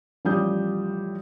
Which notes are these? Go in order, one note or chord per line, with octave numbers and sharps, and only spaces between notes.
A1 F3 G3 G4 D#6 G6